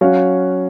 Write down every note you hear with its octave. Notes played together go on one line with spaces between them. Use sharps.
F#3 C#4 F#4 C#5 F5